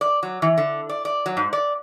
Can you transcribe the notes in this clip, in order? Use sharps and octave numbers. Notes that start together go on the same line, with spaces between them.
D5
F#3
E3
D3
D5
D5
F#3
G#2
D5